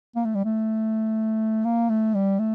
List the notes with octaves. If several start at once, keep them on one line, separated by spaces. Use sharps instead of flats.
A#3
A3
G3
A3
A#3
A3
G3
A3